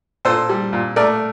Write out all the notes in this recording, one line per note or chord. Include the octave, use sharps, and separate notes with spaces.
A#2 A4 C5
G3
A#2
A3 A#4 D5